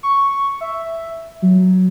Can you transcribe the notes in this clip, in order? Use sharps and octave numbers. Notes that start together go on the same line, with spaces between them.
C#6
E5
F#3